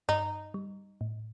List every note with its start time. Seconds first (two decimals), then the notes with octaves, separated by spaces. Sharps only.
0.09 G2 D#4
0.54 G3
1.01 A2